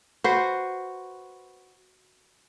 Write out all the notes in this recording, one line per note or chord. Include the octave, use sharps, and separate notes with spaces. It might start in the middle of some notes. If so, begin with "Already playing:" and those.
F#4 B4 C5